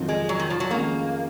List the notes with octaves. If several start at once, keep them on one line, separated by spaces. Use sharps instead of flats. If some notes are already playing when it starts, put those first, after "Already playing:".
Already playing: F2 D#3 F#3 C4 F4
G#3
F#3
D#3
F3
F#3
F2 D#3 G#3 A#3 C#4 G#4